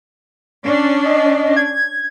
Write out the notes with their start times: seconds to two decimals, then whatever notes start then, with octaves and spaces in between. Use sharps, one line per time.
0.64 C#4 D4
1.05 D#5
1.57 G#6